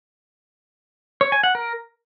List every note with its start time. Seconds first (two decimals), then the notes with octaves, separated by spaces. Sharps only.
1.21 C#5
1.32 G#5
1.44 F#5
1.55 A#4